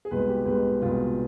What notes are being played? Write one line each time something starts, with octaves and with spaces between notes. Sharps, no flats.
G#4
C2 B2 G#3 B4
G4
C2 B2 G#3 B4
C2 B2 G#3 F4